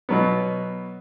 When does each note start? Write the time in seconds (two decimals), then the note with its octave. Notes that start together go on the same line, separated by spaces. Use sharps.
0.09 B2 F#3 B3